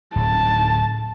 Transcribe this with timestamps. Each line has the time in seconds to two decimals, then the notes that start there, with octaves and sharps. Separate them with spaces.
0.16 D1 A5